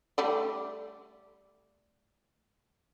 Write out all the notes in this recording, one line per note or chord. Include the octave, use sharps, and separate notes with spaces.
G3 A3 D5